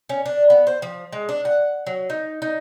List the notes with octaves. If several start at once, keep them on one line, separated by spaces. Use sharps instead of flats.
C#4
D4
B3
C5
F3
G#3
D4
F#5
F#3
D#4
D#4